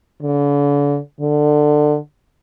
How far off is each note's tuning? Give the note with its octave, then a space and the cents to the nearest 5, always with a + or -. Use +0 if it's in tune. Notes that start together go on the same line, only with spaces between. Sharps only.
D3 -40
D3 +20